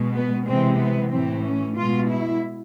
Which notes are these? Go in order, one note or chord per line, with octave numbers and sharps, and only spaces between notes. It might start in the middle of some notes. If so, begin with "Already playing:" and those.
Already playing: B2 G#3
B3
C3 E3 G#3 C4
B3
A2 E3 A3 C4
C#4
B2 G#3 F4
E4